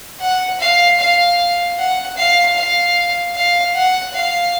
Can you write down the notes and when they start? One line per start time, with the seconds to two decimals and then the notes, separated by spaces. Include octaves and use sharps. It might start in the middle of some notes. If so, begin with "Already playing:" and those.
0.21 F#5
0.60 F5
1.00 F5
1.78 F#5
2.17 F5
2.57 F5
3.35 F5
3.75 F#5
4.14 F5